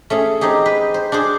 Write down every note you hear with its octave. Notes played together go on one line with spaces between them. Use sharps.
A3 C#4 G#4
C4 D#4 G4 G#4
B4 C5
C5
D4 F#4 G#4 C5